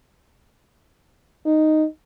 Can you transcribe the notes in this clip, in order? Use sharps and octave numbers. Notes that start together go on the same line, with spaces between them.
D#4